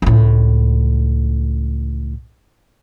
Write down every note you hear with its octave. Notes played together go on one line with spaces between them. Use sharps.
C#2 A2